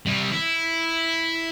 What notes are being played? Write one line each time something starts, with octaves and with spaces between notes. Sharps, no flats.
C3 G3
E4